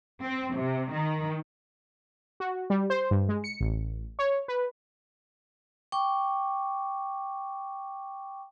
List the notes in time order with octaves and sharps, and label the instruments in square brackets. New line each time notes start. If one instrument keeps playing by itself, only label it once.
[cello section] C4
C3
D#3
[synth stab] F#4
G3
C5
G2
G#3
C#7
A1
C#5
B4
[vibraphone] G5 C#6 D6